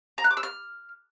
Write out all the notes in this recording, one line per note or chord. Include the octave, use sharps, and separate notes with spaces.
A#5
F#6
D6
E6
F6